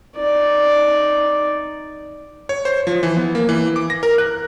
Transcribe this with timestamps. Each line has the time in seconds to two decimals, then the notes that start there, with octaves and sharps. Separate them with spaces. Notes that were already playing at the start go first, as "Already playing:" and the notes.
0.16 D#4 D5
2.49 C#5
2.65 C5
2.87 F3
3.03 E3
3.17 B3
3.35 A#3
3.49 E3
3.76 D6
3.90 A#6
4.03 A#4
4.18 F#6